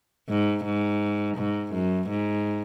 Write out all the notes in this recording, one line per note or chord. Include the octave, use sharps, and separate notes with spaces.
G#2
G#2
G#2
F#2
G#2